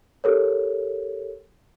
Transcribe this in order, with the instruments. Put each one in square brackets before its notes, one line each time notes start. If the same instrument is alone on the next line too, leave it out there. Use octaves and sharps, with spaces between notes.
[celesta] G4 A4 A#4 C#5